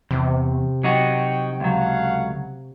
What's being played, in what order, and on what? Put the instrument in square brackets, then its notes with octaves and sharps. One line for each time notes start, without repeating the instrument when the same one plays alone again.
[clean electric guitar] E2 [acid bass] C3
[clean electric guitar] F#3 D#4 F#4 [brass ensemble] G5
[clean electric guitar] C#2 F#3 [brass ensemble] A3 F5 F#5